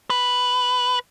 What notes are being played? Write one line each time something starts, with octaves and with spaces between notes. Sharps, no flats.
B4